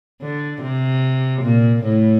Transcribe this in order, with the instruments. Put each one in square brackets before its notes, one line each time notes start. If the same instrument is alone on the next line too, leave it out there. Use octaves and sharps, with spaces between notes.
[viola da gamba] D3
C3
A#2
A2